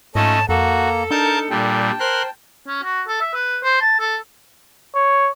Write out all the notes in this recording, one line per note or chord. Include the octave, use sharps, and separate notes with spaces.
G#2 A3 C#4 D#4 F4 D#5 A5
F2 A#3 F#4 A4 A#5
D4 D#4 A#4 A5 G6
A#2 G3 G5 A5
A#4 C5 C6 F#6
C#4
F#4
A4
E5
B4
C5
A5
A4
C#5